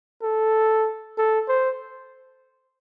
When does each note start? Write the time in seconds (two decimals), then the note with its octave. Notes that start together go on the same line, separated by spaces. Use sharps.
0.23 A4
1.18 A4
1.48 C5